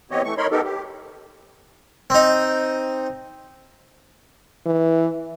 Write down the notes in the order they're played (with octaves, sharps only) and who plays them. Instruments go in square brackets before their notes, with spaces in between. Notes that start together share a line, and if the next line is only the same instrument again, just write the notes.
[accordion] E3 B3 C4 G4 C#5 D#5
E3 A3 C#6
D#4 A#4 C#5 B5 C6
B3 D#4 G4 A4 A#4
G4
[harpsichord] C4 D#4
[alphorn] E3